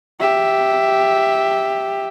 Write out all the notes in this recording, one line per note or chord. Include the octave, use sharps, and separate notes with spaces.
G4 E5